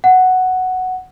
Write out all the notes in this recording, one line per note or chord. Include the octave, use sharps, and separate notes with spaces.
F#5